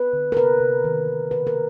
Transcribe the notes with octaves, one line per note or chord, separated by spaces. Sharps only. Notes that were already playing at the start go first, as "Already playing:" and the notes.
Already playing: B4
D3
A#4
C3 B4
C3
D#3
D#3
C#3 B4
A#4